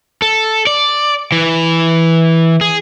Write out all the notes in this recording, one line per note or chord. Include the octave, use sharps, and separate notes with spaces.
A4
D5
E3
G#4